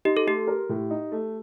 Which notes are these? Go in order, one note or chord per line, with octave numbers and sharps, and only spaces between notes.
D#4 G4
A4
A3 G4
A#4
A2
D#4
A3